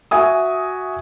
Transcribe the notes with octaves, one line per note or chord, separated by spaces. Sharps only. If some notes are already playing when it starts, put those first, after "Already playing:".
F#4 E5 G#5 D#6